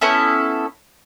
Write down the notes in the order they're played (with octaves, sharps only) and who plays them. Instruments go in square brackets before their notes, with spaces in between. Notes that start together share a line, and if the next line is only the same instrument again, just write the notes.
[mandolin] B3 C#4 E4 A4